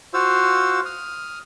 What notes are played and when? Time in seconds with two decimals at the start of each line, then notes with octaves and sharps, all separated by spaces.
0.14 F4 F#4 C5 F5 E6
0.85 D#6 F6